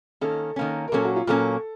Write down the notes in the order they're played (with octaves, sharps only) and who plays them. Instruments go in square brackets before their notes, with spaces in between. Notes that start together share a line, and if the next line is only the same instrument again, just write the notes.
[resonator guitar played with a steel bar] D#3 A#3 C#4 [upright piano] A4
[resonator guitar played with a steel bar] D#3 A#3 C#4
[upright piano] A#4
[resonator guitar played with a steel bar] A#2 F#3 A#3 C#4 [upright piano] A4
[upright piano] F#4
F4
[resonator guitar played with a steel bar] A#2 F#3 A#3 C#4 [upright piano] A4